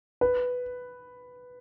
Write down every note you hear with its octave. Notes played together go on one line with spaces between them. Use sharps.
B4